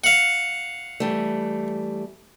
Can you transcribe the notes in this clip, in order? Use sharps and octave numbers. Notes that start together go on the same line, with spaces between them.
F5 F#5
E3 G3 A3